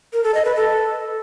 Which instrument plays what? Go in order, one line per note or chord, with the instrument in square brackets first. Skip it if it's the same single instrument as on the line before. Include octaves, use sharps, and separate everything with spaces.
[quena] A#4
A4
D#5
B4
A4